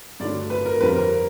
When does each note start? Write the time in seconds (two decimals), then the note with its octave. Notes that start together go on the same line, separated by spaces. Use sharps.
0.20 G2 D3 F#3 A3 D4 D5
0.50 B4
0.66 A#4
0.81 F2 D3 G3 C4 B4
0.96 A#4